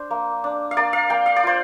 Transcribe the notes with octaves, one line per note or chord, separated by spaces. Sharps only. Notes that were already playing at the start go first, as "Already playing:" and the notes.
Already playing: D4 C5
A#3
D4
F5
A#3 D5
F5
A#3 G5
F5
D5
F4 C5